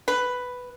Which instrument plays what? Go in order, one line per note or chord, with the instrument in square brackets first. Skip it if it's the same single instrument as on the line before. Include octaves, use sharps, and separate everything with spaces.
[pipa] B4